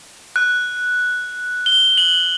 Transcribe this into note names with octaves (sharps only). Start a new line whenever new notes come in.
F#6
G7
F#7